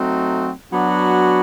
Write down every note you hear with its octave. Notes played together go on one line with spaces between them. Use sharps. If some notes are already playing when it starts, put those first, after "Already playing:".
Already playing: F#3 A3 C4 D#4 F#4
F#3 B3 D4 F#4